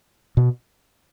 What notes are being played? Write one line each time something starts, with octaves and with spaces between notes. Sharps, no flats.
B2